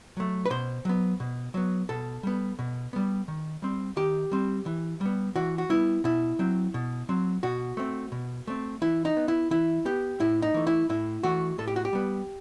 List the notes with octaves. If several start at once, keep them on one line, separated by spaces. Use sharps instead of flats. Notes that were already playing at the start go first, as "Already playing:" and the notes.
F#3 A3
B4
B2 C5
F#3 B3
B2
F#3 B3
B2 A4
G3 B3
B2
G3 B3
D#3
G3 C4
D#3 G4
G3 C4
E3
G3 B3
E3 F#4
F#4
G3 B3 E4
B2 E4
F#3 C4
B2
F#3 C4
B2 F#4
A3 C4
B2
A3 C4
E3 E4
D#4
B3
E4
E3 E4
B3 G4
A2 E4
D#4
E3 A3
E4
A2 E4
E3 A3 F#4
A2 A4
G4
F#4
G4
G3 B3